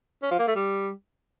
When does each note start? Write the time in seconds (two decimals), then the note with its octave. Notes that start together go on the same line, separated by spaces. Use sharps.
0.23 C#4
0.31 F3
0.39 A#3
0.48 A3
0.56 G3